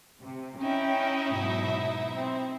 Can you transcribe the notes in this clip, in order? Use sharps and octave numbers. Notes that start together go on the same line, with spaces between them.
C3
C#4 D#4 E4 E5 G5
G#2 B2 F#3
C4